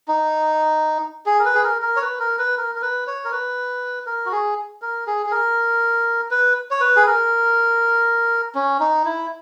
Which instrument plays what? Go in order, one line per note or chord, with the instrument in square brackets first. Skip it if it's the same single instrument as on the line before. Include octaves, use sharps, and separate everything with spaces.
[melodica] D#4
G#4
A#4
B4
G#4
A#4
A#4
C#5
B4
A#4
B4
A#4
A#4
B4
C#5
A#4
B4
A#4
F#4
G#4
A#4
G#4
G#4
A#4
B4
C#5
B4
G#4
A#4
C#4
D#4
E4